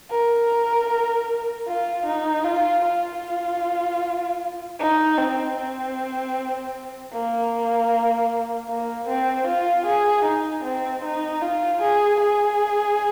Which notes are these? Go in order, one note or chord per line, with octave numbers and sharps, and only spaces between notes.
A#4
F4
D#4
F4
F4
D#4
C4
C4
A#3
A#3
C4
F4
G#4
D#4
C4
D#4
F4
G#4
G#4